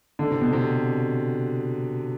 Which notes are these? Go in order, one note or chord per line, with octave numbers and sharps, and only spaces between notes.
D3
C3
B2
C3